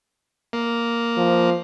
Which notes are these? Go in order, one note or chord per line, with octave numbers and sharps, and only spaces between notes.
A#3
F3